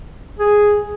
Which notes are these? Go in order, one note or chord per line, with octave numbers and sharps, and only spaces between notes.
G#4